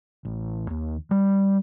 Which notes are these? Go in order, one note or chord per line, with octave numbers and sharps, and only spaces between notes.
A1
D#2
G3